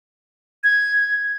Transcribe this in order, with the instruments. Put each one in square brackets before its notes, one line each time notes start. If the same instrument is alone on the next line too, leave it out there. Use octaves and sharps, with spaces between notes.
[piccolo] G#6